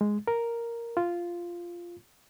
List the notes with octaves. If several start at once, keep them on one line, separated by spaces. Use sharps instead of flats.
G#3
A#4
F4